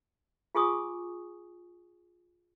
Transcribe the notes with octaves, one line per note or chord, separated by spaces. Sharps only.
F4 G#4 G#5 C#6 D#6